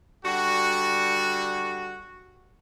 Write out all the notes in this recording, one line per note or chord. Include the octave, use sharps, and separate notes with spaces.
D3 G3 F#4